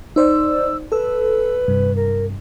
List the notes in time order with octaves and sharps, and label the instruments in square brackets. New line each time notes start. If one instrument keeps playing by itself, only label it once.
[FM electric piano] D#4 C5 D5 [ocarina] E6
[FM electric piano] A4 E6 [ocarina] B4
[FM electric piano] G2 C3
[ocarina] A#4